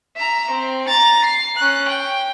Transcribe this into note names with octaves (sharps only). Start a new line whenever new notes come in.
E5 A#5
C4
A#5 A6
C7
C#4 F#6
G5